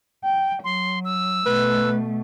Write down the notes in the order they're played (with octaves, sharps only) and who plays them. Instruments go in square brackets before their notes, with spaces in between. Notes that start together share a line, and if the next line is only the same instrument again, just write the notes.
[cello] G5
[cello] F#3 [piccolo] C6
[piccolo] E6
[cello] B2 A3 [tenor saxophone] B4